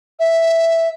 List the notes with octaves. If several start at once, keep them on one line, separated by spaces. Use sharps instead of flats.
E5